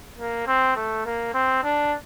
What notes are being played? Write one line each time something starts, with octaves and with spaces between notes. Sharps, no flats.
A#3
C4
A3
A#3
C4
D4